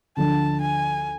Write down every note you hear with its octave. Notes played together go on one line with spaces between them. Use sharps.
D2 D3 F3 A5
G#5